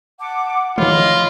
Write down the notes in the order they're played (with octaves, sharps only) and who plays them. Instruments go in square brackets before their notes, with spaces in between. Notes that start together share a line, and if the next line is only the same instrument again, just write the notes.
[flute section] F#5 A5 D6
[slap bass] D#3 F3 A3 [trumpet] F4 [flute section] C#5 D#5 B5